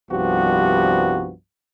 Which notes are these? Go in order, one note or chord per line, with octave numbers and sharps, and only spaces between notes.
C2 G2 F3 B3 F#4 G4